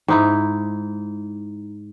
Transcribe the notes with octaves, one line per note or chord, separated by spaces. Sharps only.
G#2 D#4 E4